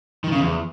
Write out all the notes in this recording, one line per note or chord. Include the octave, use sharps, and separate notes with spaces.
D#3
C#3
E2